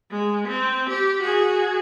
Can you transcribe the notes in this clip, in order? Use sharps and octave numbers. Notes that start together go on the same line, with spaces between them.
G#3
C4
G4
F#4 G#4